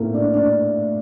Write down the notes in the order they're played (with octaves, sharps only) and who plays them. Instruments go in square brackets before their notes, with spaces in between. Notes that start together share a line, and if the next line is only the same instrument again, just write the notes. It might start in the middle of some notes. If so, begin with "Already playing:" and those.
Already playing: [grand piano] A2 C4 [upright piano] A3 A#3
[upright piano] D4
D4